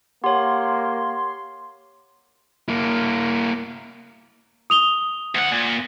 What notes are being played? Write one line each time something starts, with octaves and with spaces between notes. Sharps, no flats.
A#3 G4 C#5 F#5 C6
A#3 E4
D#6 F7 G7
D2 F#5
A#2